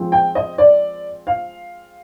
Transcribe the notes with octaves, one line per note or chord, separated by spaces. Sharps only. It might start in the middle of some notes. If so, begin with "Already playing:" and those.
Already playing: F3 G#3 C4
G5
D#5
D5
F5